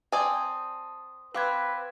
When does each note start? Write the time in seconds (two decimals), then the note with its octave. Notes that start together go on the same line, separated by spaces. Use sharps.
0.12 C4 D5 G#5 A5 D#6
1.34 C4 B4 F5 D6 E6 G#6